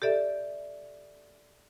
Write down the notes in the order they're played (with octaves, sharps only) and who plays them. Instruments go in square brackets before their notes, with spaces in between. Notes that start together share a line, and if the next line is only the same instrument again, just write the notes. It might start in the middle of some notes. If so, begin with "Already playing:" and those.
[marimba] G4 A4 D5 E5